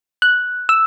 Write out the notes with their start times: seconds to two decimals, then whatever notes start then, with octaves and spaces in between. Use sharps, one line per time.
0.22 F#6
0.69 E6